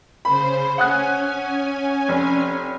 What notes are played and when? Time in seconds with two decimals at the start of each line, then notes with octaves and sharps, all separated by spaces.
0.25 C#3 C5 B5
0.78 C#4 F#5 G#5 D#6 F#6
2.09 F1